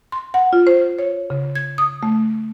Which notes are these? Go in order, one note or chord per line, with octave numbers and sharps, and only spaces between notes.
C6
F#5
F4
C5
C#5
C#3
G#6
D#6
A3